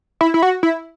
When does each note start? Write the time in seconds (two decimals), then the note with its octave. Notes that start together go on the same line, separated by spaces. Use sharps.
0.21 E4
0.34 E4
0.43 F#4
0.63 E4